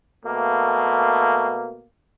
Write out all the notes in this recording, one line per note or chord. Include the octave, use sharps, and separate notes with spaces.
B2 A3 A#3